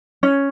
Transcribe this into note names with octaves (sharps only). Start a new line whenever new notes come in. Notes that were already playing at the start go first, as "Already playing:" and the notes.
C#4